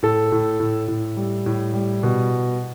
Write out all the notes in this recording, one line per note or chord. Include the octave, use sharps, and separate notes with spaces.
A2 A4
A2
A2
A2
G3
A2
G3
B2